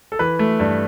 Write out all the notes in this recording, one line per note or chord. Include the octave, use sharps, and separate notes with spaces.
A4
E3 B4
A3
G2